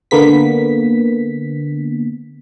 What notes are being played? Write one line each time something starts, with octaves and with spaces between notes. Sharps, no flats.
D3 A#3 B3 B6